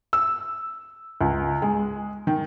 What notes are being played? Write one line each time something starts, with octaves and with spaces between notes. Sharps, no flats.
E6
C#2
G#3
D#3